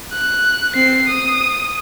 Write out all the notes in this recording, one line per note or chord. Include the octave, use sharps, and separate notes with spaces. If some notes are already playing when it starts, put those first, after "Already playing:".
F#6
C4 C7
D#6